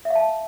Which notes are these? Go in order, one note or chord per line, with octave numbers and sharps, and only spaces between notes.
E5
F5
A5